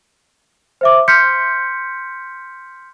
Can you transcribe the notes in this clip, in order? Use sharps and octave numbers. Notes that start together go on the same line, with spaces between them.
C5 E5 D6
C6 F6 G6 B6 C#7